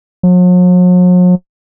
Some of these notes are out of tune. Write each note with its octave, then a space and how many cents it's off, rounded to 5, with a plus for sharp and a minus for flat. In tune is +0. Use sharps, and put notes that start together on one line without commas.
F#3 -45